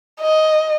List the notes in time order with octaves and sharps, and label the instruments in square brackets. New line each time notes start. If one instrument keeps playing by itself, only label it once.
[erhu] D#5